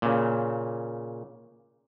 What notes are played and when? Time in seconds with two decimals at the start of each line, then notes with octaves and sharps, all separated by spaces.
0.02 A#2 C#3